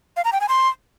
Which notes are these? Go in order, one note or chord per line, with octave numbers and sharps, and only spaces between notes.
F5
A#5
G5
G#5
C6